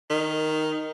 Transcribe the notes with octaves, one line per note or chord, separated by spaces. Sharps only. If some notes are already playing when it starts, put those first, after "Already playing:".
D#3